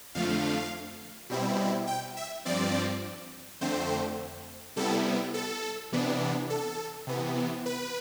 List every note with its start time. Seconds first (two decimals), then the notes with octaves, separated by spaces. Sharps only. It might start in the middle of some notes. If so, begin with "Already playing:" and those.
0.15 F2 D3 F3 A3 F5
1.29 B2 G3 C4 E4
1.87 G5
2.17 E5
2.45 G2 F3 C4 D5
3.61 F2 D3 A3 C4 C5
4.76 C3 G3 B3 E4 A4
5.34 A4
5.92 C3 E3 B3 D4
6.50 A4
7.07 C3 E3 B3
7.66 B4